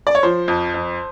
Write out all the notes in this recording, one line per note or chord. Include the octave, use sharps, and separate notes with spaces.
D5
C#5
F3 C5
F2
F2